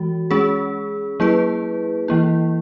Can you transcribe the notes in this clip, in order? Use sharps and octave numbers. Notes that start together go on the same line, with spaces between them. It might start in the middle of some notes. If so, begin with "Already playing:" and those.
Already playing: E3 G#3 F#4
G#3 C#4 G#4
F#3 A#3 E4 G#4 B4
E3 A#3 E4